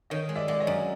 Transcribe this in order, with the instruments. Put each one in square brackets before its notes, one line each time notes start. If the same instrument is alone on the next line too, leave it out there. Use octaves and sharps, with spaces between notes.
[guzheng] D#3 [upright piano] C#5 D#5
[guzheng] G#3
[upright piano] D5 E5
[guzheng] G#3 [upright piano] D5
[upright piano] C#5 D#5
[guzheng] F#2